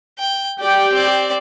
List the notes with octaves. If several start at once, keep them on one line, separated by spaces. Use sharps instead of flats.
G5
G4 D5 G5
C4 D5